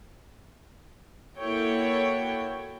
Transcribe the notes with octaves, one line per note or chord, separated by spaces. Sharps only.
A#3 E4 F#4 A4 C#5 G5